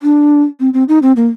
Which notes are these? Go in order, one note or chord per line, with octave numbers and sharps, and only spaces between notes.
D4
C4
C4
D#4
C4
A#3